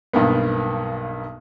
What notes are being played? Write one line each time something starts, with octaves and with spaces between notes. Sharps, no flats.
B1 G2 A#3 B3